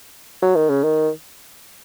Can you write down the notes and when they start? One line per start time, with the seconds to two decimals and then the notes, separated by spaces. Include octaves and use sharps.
0.42 F#3
0.56 D#3
0.70 C#3
0.84 D#3